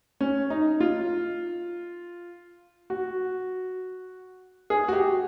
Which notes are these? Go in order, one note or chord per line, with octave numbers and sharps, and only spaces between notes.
C#4
D#4
F4
F#4
G#4
F#4
G4